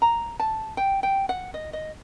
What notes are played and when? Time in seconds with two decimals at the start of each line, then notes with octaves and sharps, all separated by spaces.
0.02 A#5
0.40 A5
0.77 G5
1.03 G5
1.29 F#5
1.54 D#5
1.73 D#5